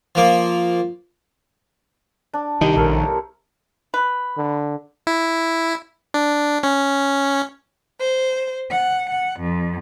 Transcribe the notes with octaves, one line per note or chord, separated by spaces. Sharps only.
F3 A#3
D4
C2 D#3 D#4 G5
A#1 A4 A#4 C#5
B4
D3
E4
D4
C#4
C5
F#5
F#5
F2